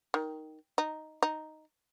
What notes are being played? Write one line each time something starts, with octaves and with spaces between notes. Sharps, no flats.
D#3
D#4
D#4